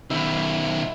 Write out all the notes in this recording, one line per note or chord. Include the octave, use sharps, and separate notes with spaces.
B2 D#3 E4